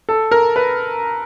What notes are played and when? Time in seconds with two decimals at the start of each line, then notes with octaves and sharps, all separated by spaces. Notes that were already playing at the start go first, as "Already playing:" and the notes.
0.09 A4
0.31 A#4
0.56 B4